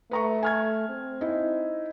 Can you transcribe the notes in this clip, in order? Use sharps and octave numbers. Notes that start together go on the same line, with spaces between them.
A3 B4 A#5 C#6
G#5 F6 G#6
C4
D#4 E4